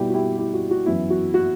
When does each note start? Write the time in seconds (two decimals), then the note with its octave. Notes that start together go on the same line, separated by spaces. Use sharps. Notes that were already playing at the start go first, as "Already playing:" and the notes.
Already playing: B2 G3 B3 E4 G4
0.10 F#4
0.14 E4 G4
0.38 E4 G4
0.54 F#4
0.71 F#4
0.86 F#2 E3 B3 E4
1.10 F#4
1.34 F#4